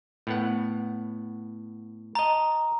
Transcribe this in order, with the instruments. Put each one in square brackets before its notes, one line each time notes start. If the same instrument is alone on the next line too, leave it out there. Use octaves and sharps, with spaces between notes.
[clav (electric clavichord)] A2 B3 F#5
[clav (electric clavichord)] D#5 A5 [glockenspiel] A#5